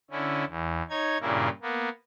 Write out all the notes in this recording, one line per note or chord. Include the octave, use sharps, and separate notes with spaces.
D3 C#4 E4
E2
D#4 C#5 G#6
G2 A#2 C#3 A#3 E4
A#3 B3